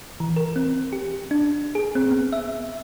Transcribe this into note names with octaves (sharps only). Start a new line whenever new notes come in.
E3
A#4
C4
G4
D4
G#4
C4
B3
E5